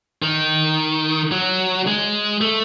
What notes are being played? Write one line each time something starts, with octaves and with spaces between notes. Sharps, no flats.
D#3
F#3
G#3
A3